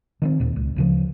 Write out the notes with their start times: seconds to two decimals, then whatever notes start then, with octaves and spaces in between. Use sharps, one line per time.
0.22 D#3 B3 C4
0.40 D#2 A#2
0.56 C#2
0.76 D2 C#3 F3